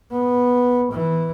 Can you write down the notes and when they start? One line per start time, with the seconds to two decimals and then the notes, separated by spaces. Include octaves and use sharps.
0.11 B3
0.92 E3